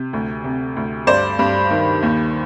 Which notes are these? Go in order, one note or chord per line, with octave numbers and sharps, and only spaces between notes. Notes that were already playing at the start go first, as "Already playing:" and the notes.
Already playing: C3
D2
C3
D2
G2 C5 D5
G2
D#3
D#2